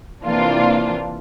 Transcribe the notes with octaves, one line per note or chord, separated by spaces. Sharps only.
C3 E3 A#3 C4 D4 F4